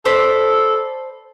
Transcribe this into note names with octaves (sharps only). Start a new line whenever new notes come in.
A4 C5 D5 B5